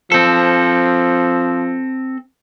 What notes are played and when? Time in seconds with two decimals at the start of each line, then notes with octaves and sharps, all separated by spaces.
0.12 F3 C4 A4